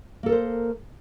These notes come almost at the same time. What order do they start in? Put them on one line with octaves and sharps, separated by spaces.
A#3 A4 A#4 C5